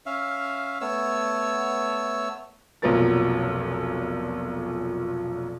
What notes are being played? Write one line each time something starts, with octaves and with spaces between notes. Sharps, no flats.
C#4 E5 F5
A3 B3 C#5 E6
F1 B1 A#2 F#3 A#4 A6